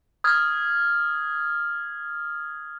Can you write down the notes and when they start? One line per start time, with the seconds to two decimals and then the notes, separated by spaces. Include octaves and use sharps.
0.24 D#6 F6 G#6